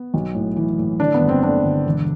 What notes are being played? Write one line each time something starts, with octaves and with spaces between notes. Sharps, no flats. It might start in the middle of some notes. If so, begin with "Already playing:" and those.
Already playing: B3
B1
A2
E3
A2
D3 D4
B3
G1
C4
D3 D4
G1
E1